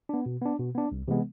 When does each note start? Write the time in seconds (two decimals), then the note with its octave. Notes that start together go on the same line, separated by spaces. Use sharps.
0.09 B3 D4
0.26 B2
0.42 B3 D4
0.59 B2
0.75 B3 D4
0.92 C2
1.08 C3 E3 G#3 B3